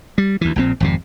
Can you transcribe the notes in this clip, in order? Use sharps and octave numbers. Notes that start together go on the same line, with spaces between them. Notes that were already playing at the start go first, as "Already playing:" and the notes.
G3
D2 E3
A#1 A#2 C4
G#1 F2 C3